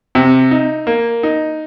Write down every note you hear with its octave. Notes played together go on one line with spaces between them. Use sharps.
C3
D#4
A#3
D#4